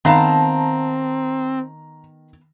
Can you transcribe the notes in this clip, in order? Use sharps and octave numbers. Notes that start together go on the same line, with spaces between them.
D#3 B3 C4 F5 A5 A#5